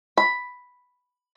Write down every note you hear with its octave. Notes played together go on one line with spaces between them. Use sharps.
B5